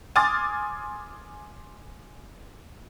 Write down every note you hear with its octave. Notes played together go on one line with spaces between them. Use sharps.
G#5 C6 D6 D#6 F6 A6